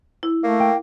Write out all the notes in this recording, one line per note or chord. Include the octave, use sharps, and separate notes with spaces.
E4
A3 A#3
G5